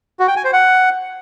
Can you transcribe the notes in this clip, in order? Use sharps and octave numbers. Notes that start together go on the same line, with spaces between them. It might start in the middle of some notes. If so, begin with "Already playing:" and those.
F#4
G5
G#5
C5
F#5